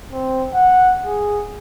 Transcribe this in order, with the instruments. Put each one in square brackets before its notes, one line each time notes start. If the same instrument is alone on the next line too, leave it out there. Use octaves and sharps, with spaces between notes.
[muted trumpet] C4
F#5
G#4